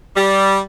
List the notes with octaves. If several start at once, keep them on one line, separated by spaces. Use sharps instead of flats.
G3